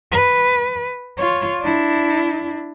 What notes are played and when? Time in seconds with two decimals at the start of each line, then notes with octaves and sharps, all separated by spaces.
0.12 B4
1.18 F4 C#5
1.61 D4 E4